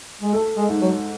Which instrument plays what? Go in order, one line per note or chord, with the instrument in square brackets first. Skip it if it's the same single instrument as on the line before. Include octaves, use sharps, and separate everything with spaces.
[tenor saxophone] G#3
[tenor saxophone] A3 [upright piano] A4
[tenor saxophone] G#3
[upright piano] G#2
[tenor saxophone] F#3